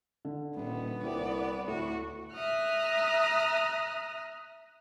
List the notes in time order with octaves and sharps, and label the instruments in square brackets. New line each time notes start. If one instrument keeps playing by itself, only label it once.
[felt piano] D3
[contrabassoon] D#1 [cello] A#2 [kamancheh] B3
[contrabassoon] C2 [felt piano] C4 E4 [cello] D5
[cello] D2 F#4 [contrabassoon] A2
[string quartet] E5 A#5 D#6 F6 F#6